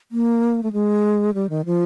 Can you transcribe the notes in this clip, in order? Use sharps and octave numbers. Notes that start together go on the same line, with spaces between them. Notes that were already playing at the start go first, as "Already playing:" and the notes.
A#3
A3
G#3
G3
D#3
F3